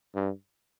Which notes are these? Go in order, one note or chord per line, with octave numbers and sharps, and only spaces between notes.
G2